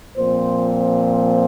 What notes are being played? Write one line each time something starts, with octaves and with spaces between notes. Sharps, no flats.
A#2 F3 C4 C5